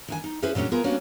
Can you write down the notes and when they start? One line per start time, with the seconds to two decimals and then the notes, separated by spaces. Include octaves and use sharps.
0.08 D#3 D4 G#5
0.24 D#4
0.42 C#4 E4 G#4 A4 B4 C5
0.55 A#2 F#3 G#3 C#4 D4
0.71 B3 F4 G#4 A#4
0.84 G3 A#3 B3 C#4 D4 F#4